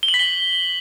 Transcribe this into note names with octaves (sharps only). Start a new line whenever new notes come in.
G7
F#7
B6
G7